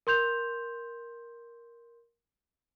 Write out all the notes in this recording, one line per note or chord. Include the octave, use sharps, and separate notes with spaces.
A#4 C6 G6 F7